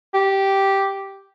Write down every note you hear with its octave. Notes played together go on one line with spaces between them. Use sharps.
G4